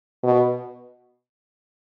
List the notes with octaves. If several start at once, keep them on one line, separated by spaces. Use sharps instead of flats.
B2